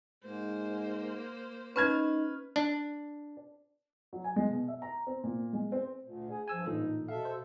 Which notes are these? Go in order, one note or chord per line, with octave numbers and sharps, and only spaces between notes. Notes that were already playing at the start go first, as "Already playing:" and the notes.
G#2 A#3 C5
C#4 D#4 B4 F6 G#6
D4
F#3
G#5
G#3
B2
E5
A#5
C4
A#2
G#3
C4
D2 A#2
G#4
G2 F3 G#5 E6
A1 A#2 D#4 A4
B2 A4 E5 F5
C5